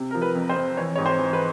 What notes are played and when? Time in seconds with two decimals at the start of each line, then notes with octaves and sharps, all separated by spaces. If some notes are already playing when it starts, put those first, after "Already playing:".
Already playing: C3
0.11 F3 A#4
0.22 B4
0.35 F2
0.49 C5
0.56 F2
0.77 E3 C#5
0.96 G#2 C#5
1.06 C5
1.19 E3
1.33 B4